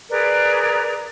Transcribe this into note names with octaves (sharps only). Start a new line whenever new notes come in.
G#4 A#4 B4 D5